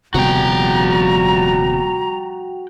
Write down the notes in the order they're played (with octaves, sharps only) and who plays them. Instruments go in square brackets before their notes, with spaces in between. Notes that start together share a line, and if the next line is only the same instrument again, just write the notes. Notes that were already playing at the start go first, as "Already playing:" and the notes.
[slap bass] D#1 C3 B3 [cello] F3 G3 [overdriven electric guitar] F#4 G5 [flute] A#5